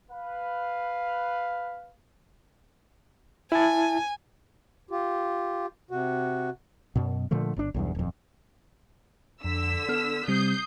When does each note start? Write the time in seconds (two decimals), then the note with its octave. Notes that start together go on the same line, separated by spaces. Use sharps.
0.10 B4 F5
3.52 E4 G#5 A5
4.91 F4 G4
5.91 C3 F#4
6.96 F#2 B2
7.31 A#2 D3 F3 A3
7.56 G1 D4
7.74 B1 E2 G2
7.95 D#1 F2
9.44 F2 D3 E6 B6
9.89 B3 A4 F6
10.28 C3 G3 C4 D#6 G6 C7